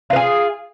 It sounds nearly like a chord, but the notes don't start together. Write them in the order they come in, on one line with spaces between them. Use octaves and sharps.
F4 B4 G#4